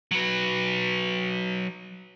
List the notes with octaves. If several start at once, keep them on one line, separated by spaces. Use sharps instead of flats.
F#3 B4